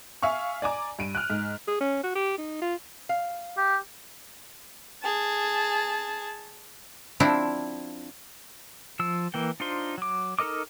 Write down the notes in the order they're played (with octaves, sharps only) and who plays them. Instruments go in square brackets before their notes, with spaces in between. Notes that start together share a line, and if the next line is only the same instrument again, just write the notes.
[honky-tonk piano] E5 F5 G#5 C#6
D5 G#5 A#5 D6
G2 D7 D#7
F6 F#6
G#2
[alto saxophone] G#4
C#4
F#4
G4
D#4
F4
[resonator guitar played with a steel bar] F5
[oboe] G4
[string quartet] G#4 A5
[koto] F3 C4 D4 E4
[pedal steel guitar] F3 E6
E3 A#3 G5
D4 D#4 F4 C5 C6
F#3 D6
D#4 A4 A#4 D#5 D6